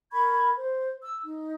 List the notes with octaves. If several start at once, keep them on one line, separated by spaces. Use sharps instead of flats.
A#4 B5 C#6 G#6
C5
E6
D#4